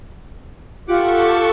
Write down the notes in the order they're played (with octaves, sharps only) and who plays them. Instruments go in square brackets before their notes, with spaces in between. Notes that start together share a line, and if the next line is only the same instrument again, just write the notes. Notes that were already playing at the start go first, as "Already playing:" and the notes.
[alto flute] F4 [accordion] G4 F#5 D6 [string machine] A4 C#6